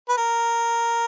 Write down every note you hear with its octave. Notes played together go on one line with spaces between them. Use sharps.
B4
A#4